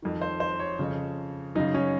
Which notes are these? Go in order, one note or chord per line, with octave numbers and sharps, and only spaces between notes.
F2 D#3
C5
C5
C#5
F2 C#3
F#2 C#3 D#4
C#4